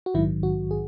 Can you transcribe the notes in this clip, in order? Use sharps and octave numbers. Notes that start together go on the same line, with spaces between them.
F#4
A#1 G#2 D#3 F#3 E4
F#4
G#4